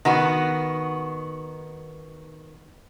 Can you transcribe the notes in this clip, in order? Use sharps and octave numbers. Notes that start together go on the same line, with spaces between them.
D#3 B3 F#4